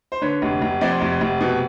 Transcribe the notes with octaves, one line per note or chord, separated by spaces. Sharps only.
C5
D3 B4 C#5
F1
F1
F2 C5 D5
F1
F1
B2